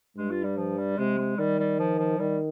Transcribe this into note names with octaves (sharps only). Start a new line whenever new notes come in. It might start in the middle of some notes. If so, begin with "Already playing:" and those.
G2 G#3
F4
G3
F3
G3
C3 G#3
G#3
D#3 G3
G3
F3
F3
D#3 G3